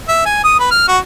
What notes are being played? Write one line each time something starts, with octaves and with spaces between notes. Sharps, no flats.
E5
G#5
D#6
B4
F6
F#4